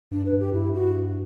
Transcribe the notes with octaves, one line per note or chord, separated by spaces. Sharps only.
G2 D4
B4
G2
G4
G2 E4
F#4